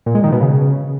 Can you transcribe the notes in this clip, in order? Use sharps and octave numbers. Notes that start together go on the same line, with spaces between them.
A#2
G#3
D#3
B2
C#3